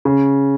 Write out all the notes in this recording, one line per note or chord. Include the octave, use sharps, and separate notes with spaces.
C#3